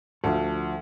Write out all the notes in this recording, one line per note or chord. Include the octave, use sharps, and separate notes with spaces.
D2 F3 D4 A4